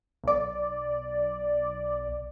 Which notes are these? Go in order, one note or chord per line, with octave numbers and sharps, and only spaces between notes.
B1 D5